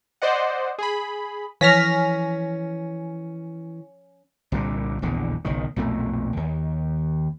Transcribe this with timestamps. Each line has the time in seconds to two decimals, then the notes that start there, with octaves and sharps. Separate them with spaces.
0.22 C5 D5 D#5 F#5
0.78 G#4 B5
1.61 E3 F3 C#4 C#5 F6 A#6 B6
4.52 C2 A#2 D3
5.02 D#1 A#1 E2 D3
5.45 F#1 B1 D#3
5.76 B1 F2 A#2 A3
6.37 D#2